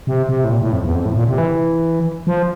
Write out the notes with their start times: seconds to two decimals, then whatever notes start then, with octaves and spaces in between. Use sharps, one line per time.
0.07 C3
0.29 C3
0.44 A2
0.51 A#2
0.62 A2
0.72 F2
0.84 E2
0.95 F2
1.05 A2
1.16 A#2
1.28 C3
1.38 E3
2.27 F3